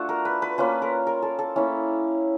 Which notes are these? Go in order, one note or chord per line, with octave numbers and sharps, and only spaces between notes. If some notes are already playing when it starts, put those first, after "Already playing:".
Already playing: A3 D4 F4 F#4
A#4
B4
B4
A#3 C#4 F4 B4
A#4
A#4
A4
A4
A#3 C#4 E4